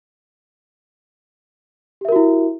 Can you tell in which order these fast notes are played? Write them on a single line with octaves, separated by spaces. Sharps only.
G4 E5 A#4 F#4 E4